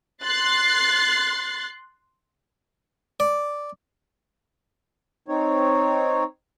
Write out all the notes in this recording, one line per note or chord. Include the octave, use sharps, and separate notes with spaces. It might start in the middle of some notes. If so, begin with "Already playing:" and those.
C6 F#6 A6 C7
D5
C4 D#4 C#5